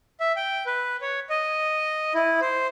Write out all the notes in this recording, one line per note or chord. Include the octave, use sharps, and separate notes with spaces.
E5
G5
B4
C#5
D#5
E4
C5